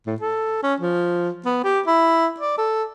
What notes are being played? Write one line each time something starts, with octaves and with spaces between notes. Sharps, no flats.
A2
A4
C#4
F3
B3
G4
E4
D5
A4